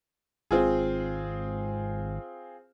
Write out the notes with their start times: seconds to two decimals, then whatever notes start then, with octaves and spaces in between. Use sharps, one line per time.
0.51 G#1 C4 F4 G#4